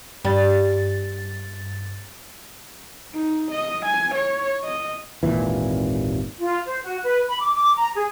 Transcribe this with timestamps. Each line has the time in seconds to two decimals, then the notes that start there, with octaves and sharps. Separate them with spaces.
0.25 G2 G3 A6
3.14 D#4
3.51 D#5
3.85 G#5
4.15 C#5
4.64 D#5
5.23 G#1 D#2 A#2 E3
6.40 F4
6.66 C5
6.83 F#4
7.04 B4
7.28 B5
7.40 D6
7.54 D6
7.77 A#5
7.95 G#4